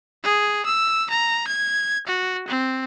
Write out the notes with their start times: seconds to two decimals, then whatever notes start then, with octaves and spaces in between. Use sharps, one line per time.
0.23 G#4
0.66 E6
1.10 A#5
1.47 G#6
2.07 F#4
2.48 C4